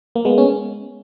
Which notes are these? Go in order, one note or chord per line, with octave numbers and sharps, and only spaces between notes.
A#3
G#3 B3
C#4